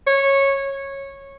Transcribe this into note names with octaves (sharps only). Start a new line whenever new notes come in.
C#5